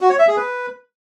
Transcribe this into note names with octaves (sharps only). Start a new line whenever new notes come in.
F#4
C#5
E5
G#4
B4